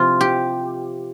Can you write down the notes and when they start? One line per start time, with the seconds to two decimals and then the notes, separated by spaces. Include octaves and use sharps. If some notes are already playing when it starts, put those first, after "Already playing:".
Already playing: C3 F3 C4 F4
0.21 G4